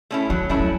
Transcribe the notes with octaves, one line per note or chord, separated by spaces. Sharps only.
A3 C#4 E4
F3 F#3
F3 A3 C#4 E4
F#3